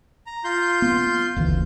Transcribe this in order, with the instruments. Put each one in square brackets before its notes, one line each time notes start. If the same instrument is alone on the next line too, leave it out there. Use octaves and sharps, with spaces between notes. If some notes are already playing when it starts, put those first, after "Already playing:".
[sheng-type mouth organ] A#5
F4 C6 G6
[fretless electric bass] B3
F#1 D2 E3